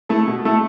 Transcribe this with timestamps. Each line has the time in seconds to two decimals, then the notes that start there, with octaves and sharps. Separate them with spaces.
0.09 A3 E4 A4
0.27 B2
0.45 A3 E4 A4